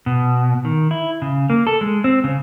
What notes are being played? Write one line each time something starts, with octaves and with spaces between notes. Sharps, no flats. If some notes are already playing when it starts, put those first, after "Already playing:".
B2
D#3
E4
C#3
A#3
A4
G#3
C4
C#3